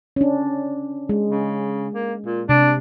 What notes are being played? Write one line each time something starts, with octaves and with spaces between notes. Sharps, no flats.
C#4 D4
G#3
C#3
A#3
A#2
C3 D4